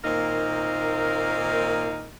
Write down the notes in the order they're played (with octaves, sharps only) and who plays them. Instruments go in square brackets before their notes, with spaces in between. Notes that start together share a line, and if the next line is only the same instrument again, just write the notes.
[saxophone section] A#2 D#3 A#3 C4 D#4 A#4